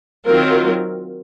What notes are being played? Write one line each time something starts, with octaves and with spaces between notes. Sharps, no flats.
D#3 F#3 C4 F4 A#4